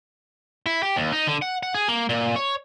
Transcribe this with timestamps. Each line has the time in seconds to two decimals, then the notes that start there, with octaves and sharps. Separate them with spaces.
0.66 E4
0.83 G4
0.96 D#2
1.13 D#4
1.27 D3
1.42 F#5
1.63 F#5
1.75 G#4
1.88 A#3
2.09 A#2
2.36 C#5